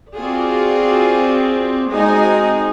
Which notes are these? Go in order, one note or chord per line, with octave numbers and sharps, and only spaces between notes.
C4 F4 F#4 G#4 D5
G#3 C4 D#4 F#4 D#5 G#5